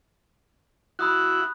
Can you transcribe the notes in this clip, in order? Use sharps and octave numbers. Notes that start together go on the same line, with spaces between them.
E4 F#4 B5 D#6 F#6